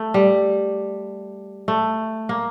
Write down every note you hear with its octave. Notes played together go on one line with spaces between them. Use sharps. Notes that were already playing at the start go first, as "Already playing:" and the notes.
Already playing: A3
G3
A3
A#3